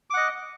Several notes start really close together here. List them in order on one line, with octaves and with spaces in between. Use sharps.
D6 F#5 D#5